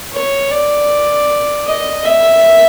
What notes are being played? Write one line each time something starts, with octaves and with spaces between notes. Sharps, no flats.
C#5
D5
D#5
E5